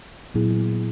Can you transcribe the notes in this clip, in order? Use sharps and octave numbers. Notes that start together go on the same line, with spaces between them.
A#2 F#3 B3 E4 G#4